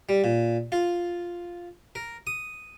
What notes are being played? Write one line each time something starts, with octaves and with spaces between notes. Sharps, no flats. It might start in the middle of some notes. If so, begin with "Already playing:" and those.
G3
A#2
F4
A#4
D#6